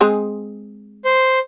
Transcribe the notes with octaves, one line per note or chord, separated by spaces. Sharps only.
G#3 C4 G#4
C5